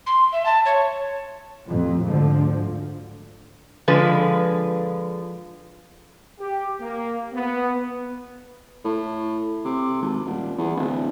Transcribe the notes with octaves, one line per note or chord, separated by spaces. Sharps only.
C6
E5
A5
C#5
A1 F2
D2 G#2 D3 F3
D3 F3 G#3 B4
G4
A#3
B3
A2
C3
G#1
D#1
E2
D1